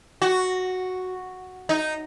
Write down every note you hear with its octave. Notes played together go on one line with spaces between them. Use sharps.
F#4
D#4